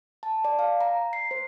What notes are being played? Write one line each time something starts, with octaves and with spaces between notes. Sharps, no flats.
A5
D5
F5
A#5
C7
C5